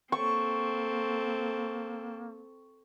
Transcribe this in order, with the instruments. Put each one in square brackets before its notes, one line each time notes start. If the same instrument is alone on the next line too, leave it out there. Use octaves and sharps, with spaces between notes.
[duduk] A#3 [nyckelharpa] C4 A4 [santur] C#6